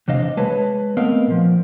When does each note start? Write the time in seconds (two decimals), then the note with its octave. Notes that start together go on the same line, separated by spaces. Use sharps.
0.08 E2 C3 D4 D#5 F5
0.37 G#3 B4 C#5 A5
0.97 A3 B3 C4 A#4 D#5 F5
1.27 A#2 F3